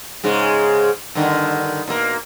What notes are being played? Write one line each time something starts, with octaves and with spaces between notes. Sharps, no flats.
G#2 C#3 G#3
G2 D3 D#3
B2 A#3